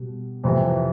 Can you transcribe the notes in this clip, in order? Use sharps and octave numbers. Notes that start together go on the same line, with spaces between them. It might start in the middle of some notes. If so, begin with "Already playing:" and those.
Already playing: B2 G3
F2 C3 E3